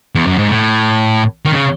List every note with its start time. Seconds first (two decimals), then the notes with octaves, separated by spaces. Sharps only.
0.15 E2
0.27 F#2
0.38 G#2
0.50 A2
1.45 D#3
1.52 C#3